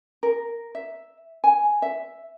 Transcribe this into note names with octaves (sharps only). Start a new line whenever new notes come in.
A#4
E5
G#5
E5